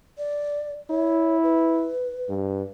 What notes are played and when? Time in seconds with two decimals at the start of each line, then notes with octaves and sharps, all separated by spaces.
0.18 D5
0.90 E4 C#5
1.43 B4
2.29 G2